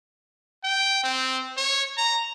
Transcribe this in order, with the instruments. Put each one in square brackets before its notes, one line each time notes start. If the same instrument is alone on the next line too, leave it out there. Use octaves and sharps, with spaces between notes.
[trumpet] G5
C4
C#5
A#5